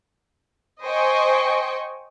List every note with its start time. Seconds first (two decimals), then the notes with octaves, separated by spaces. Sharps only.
0.82 C5 D#5 G5 G#5 C#6